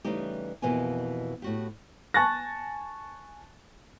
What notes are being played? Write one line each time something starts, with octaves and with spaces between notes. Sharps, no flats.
C#3 E3 G3 A3 D#4 G4
F2 B2 E3 A#3 G4 G#5
A2 F#4 G4
G#5 A5 C#6 F#6 A6 A#6